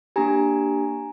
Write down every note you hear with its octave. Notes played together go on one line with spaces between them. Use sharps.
A#3 D4 G4 G#5 A#5